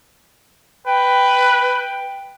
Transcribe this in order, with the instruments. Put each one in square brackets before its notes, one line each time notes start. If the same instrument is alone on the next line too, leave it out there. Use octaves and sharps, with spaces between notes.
[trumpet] B4 [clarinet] G5